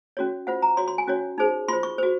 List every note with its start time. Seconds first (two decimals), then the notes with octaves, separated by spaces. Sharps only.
0.17 C#4 F#4 C#5
0.47 F4 C5 F#5
0.62 A#5
0.77 F#4 C#5 C6
0.88 C6
0.98 G#5
1.07 C#4 F#4 C#5
1.38 D#4 G#4 C5
1.68 F4 C5 C6
1.83 C#6
1.98 F#4 C5